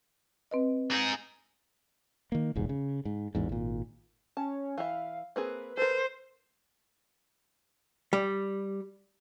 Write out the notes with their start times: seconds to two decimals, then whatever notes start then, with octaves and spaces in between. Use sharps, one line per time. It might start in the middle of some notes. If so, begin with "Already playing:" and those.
0.51 C4 B4 D#5
0.91 D#4 G#4
2.32 D#3 A#3
2.55 F1 A#1 E2 G#2
2.69 C#3
3.05 G#2
3.35 A1 E2 G#2
3.49 G#1 A#2
4.37 C#4 A5
4.78 E3 E5 F5
5.36 A#3 C4 G#4 B4
5.77 A4 A#4 C5
8.13 G3